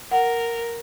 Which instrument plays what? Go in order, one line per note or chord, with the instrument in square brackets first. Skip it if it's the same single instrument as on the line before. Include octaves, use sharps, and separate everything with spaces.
[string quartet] A#4 [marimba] F#5